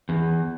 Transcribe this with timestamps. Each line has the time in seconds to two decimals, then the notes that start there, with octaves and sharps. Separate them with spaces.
0.09 E2